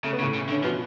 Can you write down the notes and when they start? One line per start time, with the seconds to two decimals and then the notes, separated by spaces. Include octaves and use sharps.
0.04 C#3 A3
0.13 B3
0.20 A2 C#3 A3
0.34 C#3
0.49 D3
0.52 C#4
0.64 B2 F3 B3